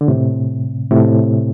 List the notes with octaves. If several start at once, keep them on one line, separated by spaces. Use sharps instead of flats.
D3
A2 C3
A2 C3